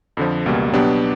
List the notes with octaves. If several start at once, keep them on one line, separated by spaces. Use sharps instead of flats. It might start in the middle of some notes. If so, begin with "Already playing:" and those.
F2 D3 F3
C#2 B2 G3 A#3
B2 F#3 B3 D4 G4